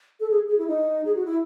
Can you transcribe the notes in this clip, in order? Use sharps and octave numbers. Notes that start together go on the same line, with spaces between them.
A4
G#4
G#4
E4
D#4
G#4
F#4
E4